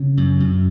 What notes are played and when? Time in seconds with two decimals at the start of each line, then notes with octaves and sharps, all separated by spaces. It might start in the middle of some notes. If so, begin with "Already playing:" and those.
Already playing: C#3
0.17 F#2
0.40 F#2